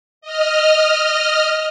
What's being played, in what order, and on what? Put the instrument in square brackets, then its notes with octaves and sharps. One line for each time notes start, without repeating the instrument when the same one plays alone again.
[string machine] D#5 F6